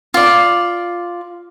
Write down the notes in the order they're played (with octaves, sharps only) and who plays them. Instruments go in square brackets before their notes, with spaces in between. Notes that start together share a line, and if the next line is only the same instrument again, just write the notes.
[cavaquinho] F4 D5